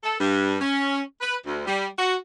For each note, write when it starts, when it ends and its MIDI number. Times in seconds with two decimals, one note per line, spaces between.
0.04 0.17 69
0.19 0.56 43
0.60 0.99 61
1.20 1.35 71
1.44 1.61 38
1.65 1.86 55
1.98 2.15 66